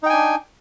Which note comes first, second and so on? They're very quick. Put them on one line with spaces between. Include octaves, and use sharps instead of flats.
D#4 G5 G#5 D4